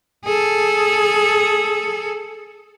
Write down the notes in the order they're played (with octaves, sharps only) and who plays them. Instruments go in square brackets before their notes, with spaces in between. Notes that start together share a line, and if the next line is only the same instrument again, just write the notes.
[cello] G#4 A4